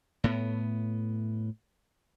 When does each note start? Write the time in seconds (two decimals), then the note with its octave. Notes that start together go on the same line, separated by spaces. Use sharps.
0.24 A2 B3